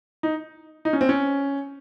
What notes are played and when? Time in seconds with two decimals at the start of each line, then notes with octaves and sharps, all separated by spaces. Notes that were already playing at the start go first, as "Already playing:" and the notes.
0.23 D#4
0.85 D#4
0.93 C#4
1.01 C4
1.09 C#4